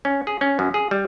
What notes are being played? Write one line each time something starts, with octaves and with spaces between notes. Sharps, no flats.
C#4
G#4
C#4
F#2
G#4
G3